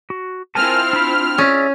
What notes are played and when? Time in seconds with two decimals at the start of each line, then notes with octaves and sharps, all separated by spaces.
0.10 F#4
0.55 C4 E4 F4 A#4 G#5 A5 F6
0.93 D4 B5
1.38 C#4 G#4 D5 E5